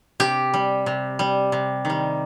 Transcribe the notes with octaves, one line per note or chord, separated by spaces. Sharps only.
C3 G4
G3
C3
G3
C3
D#3 G3